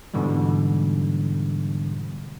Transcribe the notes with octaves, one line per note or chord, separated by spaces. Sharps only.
G#2 B2 D3 E3 G3